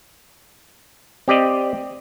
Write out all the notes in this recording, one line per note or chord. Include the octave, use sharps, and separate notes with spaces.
C4 G4 D5 D#5